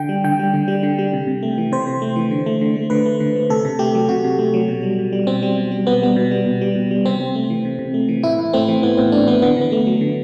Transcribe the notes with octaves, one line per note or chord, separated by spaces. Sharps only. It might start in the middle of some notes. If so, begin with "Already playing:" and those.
Already playing: D3 G5
G3
D3 G5
G3
D3
G3
D3
G3
C3
C3
A3
E3
C3 C5
C3
A3
E3
D3
A3
D3
A3
D3 B4
A3
D3
A3
C3 A4
C3
A3 G4
F#3
C3 F#4
C3
A3
F#3
B2
G3
B2
G3
B2 C4
G3
B2
G3
B2 B3
G3 B3
B2
G3
B2
G3
B2
G3
C3 C4
C3
A3
E3
C3
C3
A3
E3
A2 E4
A2
A3 C4
E3
A2 B3
A2 C4
A3 D4
E3 B3
D3 B3
D3 B3
A3
F#3
D3